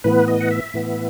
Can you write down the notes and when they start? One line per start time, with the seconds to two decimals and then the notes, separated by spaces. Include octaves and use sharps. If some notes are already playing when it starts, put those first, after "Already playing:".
0.04 A2 E3 B3 B4
0.28 D#5
0.41 F#5
0.51 E5
0.74 A2 E3 B3